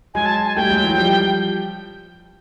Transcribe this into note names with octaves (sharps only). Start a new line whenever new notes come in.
F#3 G#3 G#5
A5
G#5
G3 A3 G5
F#3 G#3
E3 F#3
F3 G3